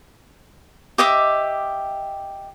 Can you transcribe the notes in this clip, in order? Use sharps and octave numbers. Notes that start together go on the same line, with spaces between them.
G4 D#5 E5 D6